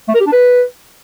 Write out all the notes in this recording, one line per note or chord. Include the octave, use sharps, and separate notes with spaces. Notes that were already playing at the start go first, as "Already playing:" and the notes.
A3
A#4
G4
D4
B4